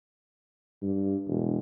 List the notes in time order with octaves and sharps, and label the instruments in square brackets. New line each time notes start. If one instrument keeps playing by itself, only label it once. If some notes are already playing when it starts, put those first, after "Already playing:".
[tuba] G2
E1